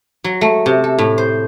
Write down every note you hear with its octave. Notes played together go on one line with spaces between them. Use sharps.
F#3
A3
C3
A4
A2
C5